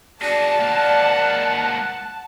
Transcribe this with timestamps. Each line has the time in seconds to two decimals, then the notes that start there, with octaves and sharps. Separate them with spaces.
0.21 F#4 G#4 D5 A5
0.60 G#2 A#3 F#5